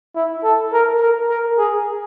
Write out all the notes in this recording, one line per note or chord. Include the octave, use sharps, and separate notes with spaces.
E4
A4
A#4
A#4
A#4
G#4